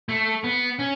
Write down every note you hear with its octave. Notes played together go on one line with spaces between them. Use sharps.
A3
B3
C#4